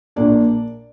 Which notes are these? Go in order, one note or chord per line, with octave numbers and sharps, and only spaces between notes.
A#1 A#2 A#3 D4 D5